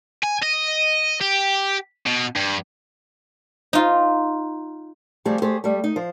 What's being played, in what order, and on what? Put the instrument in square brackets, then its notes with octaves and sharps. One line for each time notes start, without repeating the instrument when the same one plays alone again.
[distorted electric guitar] G#5
D#5
G4
B2
G2
[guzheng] D#4 F4
[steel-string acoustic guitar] F3 G3 A3 C4 G4 G#4
A3 G4 G#4 C5
G3 A3
D#4
F3 C5